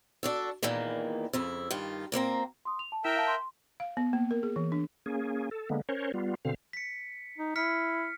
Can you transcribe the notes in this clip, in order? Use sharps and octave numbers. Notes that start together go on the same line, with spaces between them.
D4 F#4 A4
E2 A#2 D#3 E3 A#3
F2 C#3 E4
G2 D#3 D#4 F4
A#2 A#3 C4 A#5
C6 D#6
F7
A5
E4 A#4 E5 G5 B6 E7
F5 A5 G6
C6
F5
B3
A#3
A#4
G#4
E3
D4
A#3 C#4 G#4
A4
D3 G#3 A#3 B3
C#4 A#4 C5 C#5
G3 B3 F4
B2 D3 C4 F5
B6 C#7
D#4
E4 F6 B6 C#7